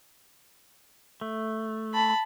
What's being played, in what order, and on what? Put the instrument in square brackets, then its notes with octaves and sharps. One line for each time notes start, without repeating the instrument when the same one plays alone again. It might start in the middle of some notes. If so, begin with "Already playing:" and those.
[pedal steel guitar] A3
[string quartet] A5 B5